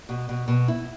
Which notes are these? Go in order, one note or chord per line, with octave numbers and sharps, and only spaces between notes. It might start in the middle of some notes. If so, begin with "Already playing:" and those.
B2
B2
B2
E4